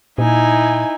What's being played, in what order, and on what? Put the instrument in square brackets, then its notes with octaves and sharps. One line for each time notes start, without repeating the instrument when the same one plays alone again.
[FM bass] A#2 [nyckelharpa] D#4 E4 [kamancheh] G#5